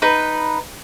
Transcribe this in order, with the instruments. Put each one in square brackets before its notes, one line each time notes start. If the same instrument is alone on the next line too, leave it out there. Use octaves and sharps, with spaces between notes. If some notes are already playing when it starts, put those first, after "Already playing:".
[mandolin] D#4 B4